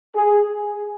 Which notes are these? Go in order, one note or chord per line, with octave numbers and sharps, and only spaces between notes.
G#4